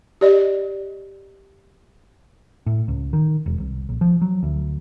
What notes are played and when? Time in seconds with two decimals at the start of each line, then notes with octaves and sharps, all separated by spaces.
0.21 G4 D5 D#5
2.66 A2
2.88 C#2
3.13 D#3
3.46 E1
3.60 C2
3.89 A#1
4.01 F3
4.22 F#3
4.43 D2